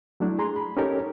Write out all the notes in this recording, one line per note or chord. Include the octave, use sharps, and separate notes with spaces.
F#3 A3 D4 E4
G#4 A#5 C6
B5
C#4 D#4 G4 A4 A#4 C#5